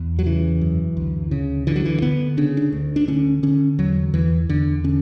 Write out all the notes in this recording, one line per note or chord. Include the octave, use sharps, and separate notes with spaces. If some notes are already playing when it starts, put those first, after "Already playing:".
Already playing: E2
F#3
C#3 E3
F#2
D2
C#3
D3 E3
F#3
E3
D3 B3
C#3 D4
D4
D2
D4
D3 C#4
D3 C#4
E2 F#3
E2 E3
E2 D3
D3 C#4